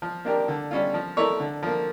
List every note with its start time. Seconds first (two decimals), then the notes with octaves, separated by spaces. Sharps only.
0.02 F3
0.25 A#3 D4 G4 A#4
0.48 D3
0.71 G3 C#4 F4
0.94 F3
1.17 A3 E4 A#4 C#5
1.40 D3
1.63 F3 A#3